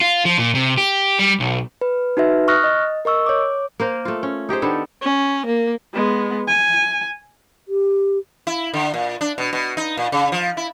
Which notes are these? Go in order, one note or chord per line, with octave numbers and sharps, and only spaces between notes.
F4
F3
A#2
C3
G4
G3
B1
B4
D#4 F#4 B4 E5
C#6 D#6 F6 F#6 A#6
D#5
A#4 D#5 C#6 E6
C#5 D6
A#3 A#4 C5
A3 F4
C#4
D#4 G4 G#4 C5
D#3 B3 D4 A4
C#4
A#3
G#3 B3
G#5
G4
E4
D3
A#2
D4
B2
B2
D#4
A#2
C#3
F3
E4